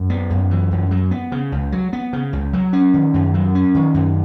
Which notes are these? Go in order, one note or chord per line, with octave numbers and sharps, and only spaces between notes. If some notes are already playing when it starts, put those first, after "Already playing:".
Already playing: F#2
B3
F#2
E3
F#2
F#3
B3
C#3
C#2
F#3
B3
C#3
C#2
F#3
C#4
D#3
F#2
F#3
C#4
D#3
F#2